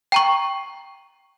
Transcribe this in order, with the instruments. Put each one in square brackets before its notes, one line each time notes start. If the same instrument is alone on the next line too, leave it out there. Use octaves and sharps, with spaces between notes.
[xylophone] G5 A#5 C#6